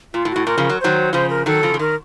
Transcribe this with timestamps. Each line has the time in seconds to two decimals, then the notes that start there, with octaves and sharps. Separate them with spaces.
0.14 A#2 F4
0.25 A2
0.31 F#4
0.36 A2
0.47 A#2 A#4
0.58 C#3 F3
0.69 F#3
0.80 D#3 F#3 C5
1.13 C#3 F3 C5
1.30 A#4
1.46 D#3 F#3 A4
1.63 C#3 F3
1.74 F3
1.79 D#3 A#4